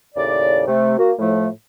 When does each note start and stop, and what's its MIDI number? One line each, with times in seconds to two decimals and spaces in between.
0.15 0.61 39
0.15 0.61 45
0.15 0.61 49
0.15 0.61 74
0.66 0.97 48
0.66 0.97 57
0.97 1.12 58
0.97 1.12 66
1.19 1.48 45
1.19 1.48 53
1.19 1.48 57